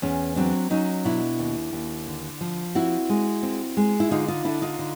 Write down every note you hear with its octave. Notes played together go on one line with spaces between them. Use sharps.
E2 C#4
F#3 C4 D4
F#3 C#4 D#4
B2 D4 E4
D#2
D#2
D3
F3
C4 E4 F#4
G#3
C4
G#3
E4
D3 D#4 F4
D#4 F4
D3 D4 E4
D#4 F4
D3